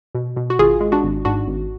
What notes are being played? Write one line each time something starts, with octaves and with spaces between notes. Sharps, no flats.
B2
B2
F#4
G#1 F4 G#4
G#3
D4 F#4
G#1
G#2 D4 F#4
G#1